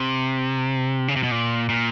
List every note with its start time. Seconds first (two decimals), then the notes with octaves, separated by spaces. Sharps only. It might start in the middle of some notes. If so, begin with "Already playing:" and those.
Already playing: C3
1.08 C#3
1.16 C3
1.23 B2
1.31 A#2
1.69 A#2